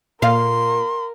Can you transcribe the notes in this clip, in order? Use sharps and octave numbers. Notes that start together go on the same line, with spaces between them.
A#2 A#4 F5 C6